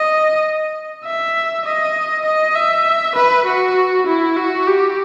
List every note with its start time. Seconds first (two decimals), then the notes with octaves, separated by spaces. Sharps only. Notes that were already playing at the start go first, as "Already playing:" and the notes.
Already playing: D#5
1.05 E5
1.65 D#5
2.25 D#5
2.56 E5
3.16 B4
3.46 F#4
4.07 E4
4.37 F#4
4.67 G4